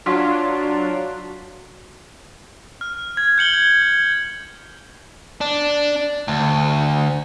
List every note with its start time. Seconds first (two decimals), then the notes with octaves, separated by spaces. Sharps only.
0.06 F#3 D4 F4 F#4 C6 B6
2.81 F6
3.17 G#6
3.38 G6 C#7 F#7 G7
3.82 G#6
5.41 D4
6.28 D2